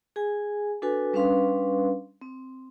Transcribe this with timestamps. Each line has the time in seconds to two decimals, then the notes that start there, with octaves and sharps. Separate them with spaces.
0.16 G#4 G#5
0.82 D4 F#4 A4 B4 G#5
1.13 G3 C#4 D4 B4 F5 C6
2.21 C4